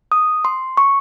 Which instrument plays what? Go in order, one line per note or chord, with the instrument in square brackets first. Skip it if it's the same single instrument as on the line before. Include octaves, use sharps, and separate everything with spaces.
[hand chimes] D#6
C6
C#6